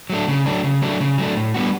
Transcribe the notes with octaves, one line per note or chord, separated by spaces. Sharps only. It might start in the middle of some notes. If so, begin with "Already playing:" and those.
F#3 A3 D4
C#3
F#3 A3 D4
C#3
F#3 A3 D4
C#3
F#3 A3 D4
A2
G3 B3 D4 F#4